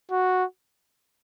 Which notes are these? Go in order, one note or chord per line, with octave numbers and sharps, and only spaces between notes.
F#4